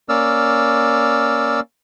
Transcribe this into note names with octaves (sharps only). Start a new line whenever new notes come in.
A#3 C#4 D5 E6 F6